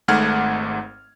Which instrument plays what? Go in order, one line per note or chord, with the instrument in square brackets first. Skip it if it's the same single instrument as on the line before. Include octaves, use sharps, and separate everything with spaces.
[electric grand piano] G#1 G#2 A3 F#5 F6 G#6